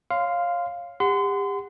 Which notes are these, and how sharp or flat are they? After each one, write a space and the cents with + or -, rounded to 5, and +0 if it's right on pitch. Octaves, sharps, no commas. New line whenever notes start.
C#5 +0 F5 +0 C6 -20
G4 +35 F#5 +0 C6 -35